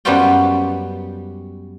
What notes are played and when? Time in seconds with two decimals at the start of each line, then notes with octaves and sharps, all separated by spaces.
0.05 F#2 G3 B3 C#4 F4 G5